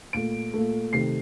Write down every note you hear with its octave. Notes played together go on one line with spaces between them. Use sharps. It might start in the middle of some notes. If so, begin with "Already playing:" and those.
A#2 A3 D7
A#2 A3
C3 D#3 A3 C7